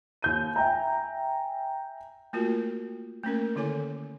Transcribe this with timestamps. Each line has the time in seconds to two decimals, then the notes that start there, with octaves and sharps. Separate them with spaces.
0.22 D#2 G6 D#7
0.56 E5 G5 G#5 A#5
2.33 A3 A#3 F4 F#4 A#4
3.23 A3 A#3 C#4 A#4
3.56 D3 D#3 E4 A4 G#5